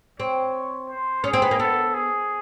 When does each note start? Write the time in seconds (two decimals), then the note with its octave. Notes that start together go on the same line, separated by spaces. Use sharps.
0.20 C4 C#5
0.89 C5
1.24 C#4 G#4
1.34 C4
1.42 B3
1.51 A#3
1.59 B3 A4
1.94 G#4